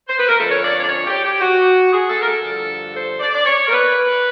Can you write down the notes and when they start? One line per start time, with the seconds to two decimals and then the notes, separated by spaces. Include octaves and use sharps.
0.08 C5
0.18 B4
0.27 A#4
0.38 F2 D3 F3 A4
0.50 C#5
0.62 D5
0.76 C#5
0.82 D5
0.88 C#5
1.06 G4
1.23 G4
1.40 F#4
1.91 G#4
2.08 A4
2.21 A#4
2.26 A4
2.42 G2 D3 F3
2.94 C5
3.19 D5
3.34 D5
3.45 C#5
3.67 A#4
3.71 B4